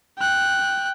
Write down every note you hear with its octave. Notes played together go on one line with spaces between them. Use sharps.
G5 F#6